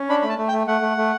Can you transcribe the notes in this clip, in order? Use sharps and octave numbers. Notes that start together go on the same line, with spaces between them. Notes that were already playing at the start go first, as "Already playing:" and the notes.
Already playing: C#4
D4 B5
A3 B5
A5
A3
G5
A3
A3 F#5
A3
A3